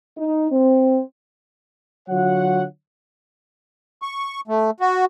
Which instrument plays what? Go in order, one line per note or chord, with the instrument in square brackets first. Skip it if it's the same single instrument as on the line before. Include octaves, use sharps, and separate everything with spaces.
[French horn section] D#4
C4
[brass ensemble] D3 F#3 F4 F#4 C#5 F#5
[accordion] C#6
A3
F#4